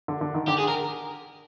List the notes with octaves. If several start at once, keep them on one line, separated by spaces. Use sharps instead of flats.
D3
D3
D#3
D3 G4
G#4
A#4